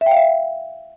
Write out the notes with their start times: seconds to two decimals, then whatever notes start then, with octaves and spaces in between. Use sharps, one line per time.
0.01 E5
0.06 G5
0.11 F5
0.17 E5